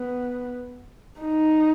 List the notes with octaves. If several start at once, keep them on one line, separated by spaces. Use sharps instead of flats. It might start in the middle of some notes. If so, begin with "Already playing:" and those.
Already playing: B3
D#4